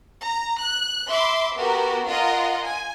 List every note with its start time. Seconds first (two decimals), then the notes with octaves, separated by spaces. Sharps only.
0.23 A#5
0.59 F#6
1.11 E5 B5 C6 D6
1.57 B3 F#4 G4 A#4
2.09 F4 A#4 D#5 F5 F#5
2.64 G#5